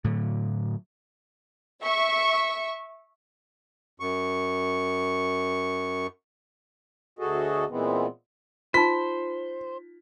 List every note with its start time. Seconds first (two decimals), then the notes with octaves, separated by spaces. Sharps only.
0.04 A2 D3 F#3
1.81 E5 C#6
4.00 F#2 C#6
7.19 D2 F#4 G#4 A4 D#5
7.70 A#2 E3 G#3 B3 C4
8.74 D#4 F4 C5 B6